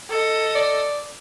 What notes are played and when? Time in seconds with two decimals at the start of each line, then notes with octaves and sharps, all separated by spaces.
0.10 A4 D#5
0.56 D5